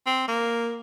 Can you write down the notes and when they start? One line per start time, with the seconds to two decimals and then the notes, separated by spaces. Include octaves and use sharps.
0.07 C4
0.28 A#3